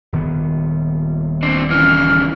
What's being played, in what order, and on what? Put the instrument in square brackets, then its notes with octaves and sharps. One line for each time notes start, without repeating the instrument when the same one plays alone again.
[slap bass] D#1 D#3 B3
[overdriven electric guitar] C4 D4
[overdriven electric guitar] C#3 E3 [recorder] F6